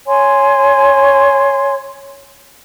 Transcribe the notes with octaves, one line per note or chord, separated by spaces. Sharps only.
C#5 G#5 C6